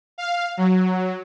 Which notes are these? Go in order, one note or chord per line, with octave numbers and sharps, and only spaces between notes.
F5
F#3